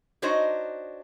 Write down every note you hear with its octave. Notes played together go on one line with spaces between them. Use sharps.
D4 D#4 F#4 C5 C#5 D#5